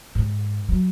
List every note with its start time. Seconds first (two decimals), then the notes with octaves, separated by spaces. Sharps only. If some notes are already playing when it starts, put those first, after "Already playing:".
0.15 G#2
0.69 F#3